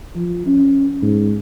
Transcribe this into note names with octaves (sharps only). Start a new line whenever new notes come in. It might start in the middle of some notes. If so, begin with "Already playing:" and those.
F3
C#4
G#2